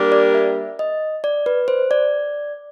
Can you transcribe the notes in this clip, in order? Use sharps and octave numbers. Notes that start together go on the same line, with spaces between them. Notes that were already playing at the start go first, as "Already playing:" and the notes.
Already playing: G3 A#3 D4 G4 A#4
D5
E5
D#5
D5
B4
C5
D5